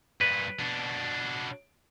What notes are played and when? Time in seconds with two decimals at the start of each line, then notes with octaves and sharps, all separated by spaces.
0.21 G2 A#2 B4
0.59 B2 D4